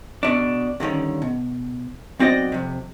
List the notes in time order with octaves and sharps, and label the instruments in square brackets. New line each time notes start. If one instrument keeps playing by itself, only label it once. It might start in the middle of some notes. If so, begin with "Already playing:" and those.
[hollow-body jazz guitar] B2 D4
G2 D3 D#3 C#4
B2
B1 C4 F#4 D5 D#5
F2 C3